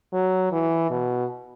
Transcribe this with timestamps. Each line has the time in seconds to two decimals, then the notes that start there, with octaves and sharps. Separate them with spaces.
0.13 F#3
0.52 E3
0.90 B2